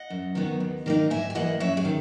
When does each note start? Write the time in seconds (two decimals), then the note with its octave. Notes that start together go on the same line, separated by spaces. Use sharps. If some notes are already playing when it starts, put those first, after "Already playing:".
Already playing: D#5 F#5
0.10 F#2
0.35 D#3 F#3 B3
0.60 D#2
0.86 D#3 A#3 D#4
1.10 G#2 E5 G#5
1.30 G#5
1.35 E3 A#3 D#5 F#5
1.60 F#2 C#5 E5
1.77 G#4
1.85 D#3